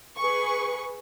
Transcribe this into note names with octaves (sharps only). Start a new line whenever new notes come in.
G#4 B4 C#6